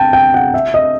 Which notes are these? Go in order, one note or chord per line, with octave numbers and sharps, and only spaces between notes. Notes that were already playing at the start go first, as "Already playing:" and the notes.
Already playing: G5 A5
G5
F#5
E5
D#5